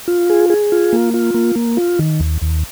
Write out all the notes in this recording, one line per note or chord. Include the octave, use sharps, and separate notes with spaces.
F4
G#4
G#4
F4
A#3
F4
A#3
A#3
F4
D#3
D#2
D#2